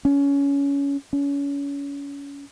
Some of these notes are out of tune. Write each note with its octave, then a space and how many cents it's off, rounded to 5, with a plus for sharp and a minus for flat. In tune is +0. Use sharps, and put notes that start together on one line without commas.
C#4 +20
C#4 +30